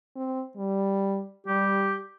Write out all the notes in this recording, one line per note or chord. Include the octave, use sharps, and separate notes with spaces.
C4
G3
G3 G4